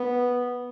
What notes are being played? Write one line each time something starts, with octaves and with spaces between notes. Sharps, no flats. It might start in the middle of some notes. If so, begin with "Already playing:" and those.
Already playing: B3